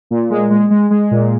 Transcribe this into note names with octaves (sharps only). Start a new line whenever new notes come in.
A#2
G#3
G#3
G#3
G#3
A#2